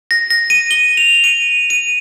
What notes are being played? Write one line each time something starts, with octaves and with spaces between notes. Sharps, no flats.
A#6
A#6
D#7
G7
F7
D#7
D#7